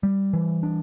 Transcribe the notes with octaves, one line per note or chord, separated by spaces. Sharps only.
G3
E3
D4